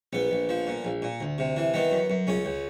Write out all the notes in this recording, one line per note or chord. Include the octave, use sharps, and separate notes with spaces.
A#1 B3
A#1
F3
A#2
A#1
A#2
D2
C3
E3
D#3 B3
F#2
F#2
C#2 C#4
C#2